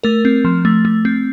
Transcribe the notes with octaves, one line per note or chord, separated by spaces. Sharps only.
A3 A#4
C4
F3
A3
A3
C4